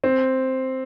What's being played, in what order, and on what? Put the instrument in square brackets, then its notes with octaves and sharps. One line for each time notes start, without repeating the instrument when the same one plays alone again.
[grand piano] C4